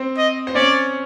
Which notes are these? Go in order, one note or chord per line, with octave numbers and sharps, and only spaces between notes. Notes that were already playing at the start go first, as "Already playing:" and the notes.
Already playing: C4 C5
D#5
C5
C#4 C#5 D5